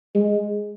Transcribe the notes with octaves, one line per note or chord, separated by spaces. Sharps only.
G#3